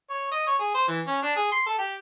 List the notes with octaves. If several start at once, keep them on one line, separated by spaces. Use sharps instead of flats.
C#5
D#5
C#5
G#4
C5
E3
C#4
D4
G#4
C6
A4
G4